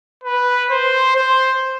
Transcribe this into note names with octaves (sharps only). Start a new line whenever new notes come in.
B4
C5
C5